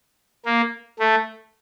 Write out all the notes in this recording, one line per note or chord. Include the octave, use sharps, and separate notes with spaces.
A#3
A3